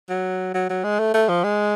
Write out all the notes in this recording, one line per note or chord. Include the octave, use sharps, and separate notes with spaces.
F#3
F#3
F#3
G#3
A3
A3
F3
G#3